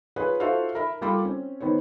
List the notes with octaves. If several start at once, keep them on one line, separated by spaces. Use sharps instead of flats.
F4 G#4 B4 C#5
F4 F#4 A4 C5 E5 F5
A#4 E5 B5
G3 A#3 F4 A4 B5 D6
C4 C#4
D#3 B3 C5 C#5